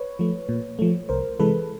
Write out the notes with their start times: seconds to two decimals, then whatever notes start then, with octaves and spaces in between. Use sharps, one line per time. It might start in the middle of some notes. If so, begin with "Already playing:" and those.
Already playing: B4 C#5
0.19 F3 A3
0.49 A#2
0.79 F3 A3
1.09 C2 A#4 C5
1.39 C3 E3 G#3 A4 B4